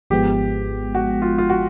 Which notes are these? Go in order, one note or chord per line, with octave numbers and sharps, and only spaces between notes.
G#1 G#2 F3 G#3 B3 G4
F#4
F4
F4
F#4